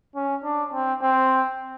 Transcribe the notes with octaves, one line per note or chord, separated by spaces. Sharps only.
C#4
D4
C4
C4